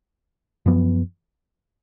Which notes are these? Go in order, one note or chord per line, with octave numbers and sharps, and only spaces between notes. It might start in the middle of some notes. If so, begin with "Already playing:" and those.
F#2 F3 B3